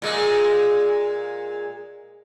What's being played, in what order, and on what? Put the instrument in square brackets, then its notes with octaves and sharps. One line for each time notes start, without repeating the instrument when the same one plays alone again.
[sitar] A#2 G#3